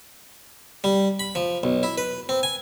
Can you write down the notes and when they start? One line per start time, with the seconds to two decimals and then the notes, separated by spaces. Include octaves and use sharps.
0.84 G3
1.20 B5
1.35 F3
1.63 B1
1.83 E4
1.98 B4
2.29 C4
2.43 G#5